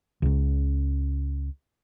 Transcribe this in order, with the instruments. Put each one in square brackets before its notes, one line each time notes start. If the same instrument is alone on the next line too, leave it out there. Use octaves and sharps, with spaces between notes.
[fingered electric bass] C#2 C#3